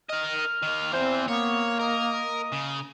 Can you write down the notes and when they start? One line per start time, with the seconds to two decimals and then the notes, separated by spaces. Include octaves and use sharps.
0.10 A#4 D#5 F6
0.63 D#3 A#3
0.93 E2 E3 C4 C5
1.28 A#3 B3 C#5
1.79 A#4 D#5
2.52 C#3